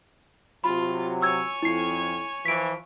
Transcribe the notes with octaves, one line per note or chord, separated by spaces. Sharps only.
C3 F#3 F4 B5
C#5 G#5 E6 G#6
F2 E4 C7
E3 F3 B6 D7